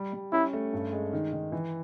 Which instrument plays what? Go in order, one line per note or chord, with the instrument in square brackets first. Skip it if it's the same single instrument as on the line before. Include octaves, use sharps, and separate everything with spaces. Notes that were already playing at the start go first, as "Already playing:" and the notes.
Already playing: [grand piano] G3
G3
[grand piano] C#4 [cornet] E4
[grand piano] A3
G2
G#3
D#3
D#3
E3